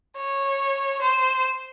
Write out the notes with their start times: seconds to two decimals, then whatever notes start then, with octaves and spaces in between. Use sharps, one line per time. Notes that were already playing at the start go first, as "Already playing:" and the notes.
0.16 C#5
1.01 C5